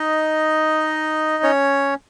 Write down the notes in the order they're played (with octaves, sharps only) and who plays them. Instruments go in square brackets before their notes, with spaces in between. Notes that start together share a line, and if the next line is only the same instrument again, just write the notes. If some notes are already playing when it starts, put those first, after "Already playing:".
Already playing: [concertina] D#4 D#5
C#4 C#5